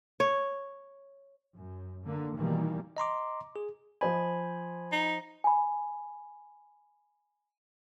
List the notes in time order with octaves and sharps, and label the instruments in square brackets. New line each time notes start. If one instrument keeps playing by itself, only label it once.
[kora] C#5
[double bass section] F#2
D3 A#3
B2 D#3 E3 G3 A#3
[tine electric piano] D#5 A#5 C6 D6
G#4
[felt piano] F3 C5 D#5 [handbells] G#5 B5 G#6
[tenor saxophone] D#4
[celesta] G#5 B5